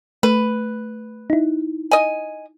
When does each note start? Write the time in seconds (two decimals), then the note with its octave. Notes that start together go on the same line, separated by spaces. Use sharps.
0.23 A3 B4
1.30 D#4 E4
1.91 D#5 G#5